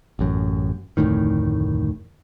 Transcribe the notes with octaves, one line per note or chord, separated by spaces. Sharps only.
A1 F#2
F1 D2 A2 D#3